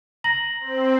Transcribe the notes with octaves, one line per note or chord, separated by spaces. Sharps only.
A#5 A#6 F#7
C4